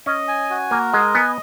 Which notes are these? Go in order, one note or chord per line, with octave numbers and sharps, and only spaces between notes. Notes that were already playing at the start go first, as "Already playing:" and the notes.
C#4 D#5
G#5
F#4
A#3 A#4
G#3 D#5
B3 G#5